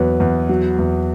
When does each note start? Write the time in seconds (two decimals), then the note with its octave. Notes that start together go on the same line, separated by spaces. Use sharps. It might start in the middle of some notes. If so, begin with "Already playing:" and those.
Already playing: E2 F#3 B4 C#5
0.20 E2
0.49 F#3
0.79 E2